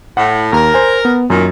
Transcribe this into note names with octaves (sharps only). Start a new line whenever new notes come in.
A2 F#5
D#2 A#4
C5 G#5
B3
F#2 A#2 D#3